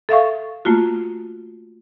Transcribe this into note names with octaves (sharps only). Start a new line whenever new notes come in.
A4 E5 F5 C#6
A3 A#3 F4 F#4